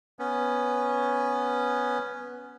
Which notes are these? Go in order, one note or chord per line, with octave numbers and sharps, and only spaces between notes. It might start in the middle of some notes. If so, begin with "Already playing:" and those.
B3 C#4